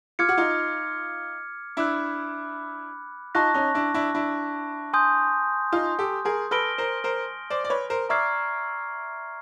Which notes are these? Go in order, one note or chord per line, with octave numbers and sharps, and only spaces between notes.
F4 D6 F6 G#6 C#7
F#4
D#4 F4
D4 E4 B5 D6 F#6
D#4 F4 A5 C#6 F#6 A#6
C#4 D#4
D4 E4
D4 E4
D4 E4
G#5 C6 D#6 G6
D#4 F4
G4 A4
G#4 A#4
A4 B4 F6 A#6 D7 G7
A#4 C5
A#4 C5
C5 D5
D5
B4 C#5
A#4 C5
D5 E5 A#5 C#6 F6 G#6 C7